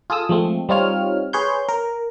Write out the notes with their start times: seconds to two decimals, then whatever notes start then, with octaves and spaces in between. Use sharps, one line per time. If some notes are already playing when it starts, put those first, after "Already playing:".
0.10 F4 G#4 A4 D#6 E6
0.29 F3 G#3 A3 C4
0.69 G3 C4 D#4 F4 C#5 F6
1.33 G#4 B4 C#5 C6 G6
1.69 A#4